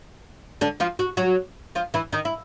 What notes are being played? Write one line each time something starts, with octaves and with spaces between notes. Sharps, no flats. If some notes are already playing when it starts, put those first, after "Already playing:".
D3 D4
F3 F4
F#4
F#3 F#4
F3 F4
E3 E4
D#3 D#4
E4